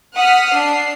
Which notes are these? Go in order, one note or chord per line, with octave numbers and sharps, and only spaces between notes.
F#5 D#6 F6 B6
D4 C7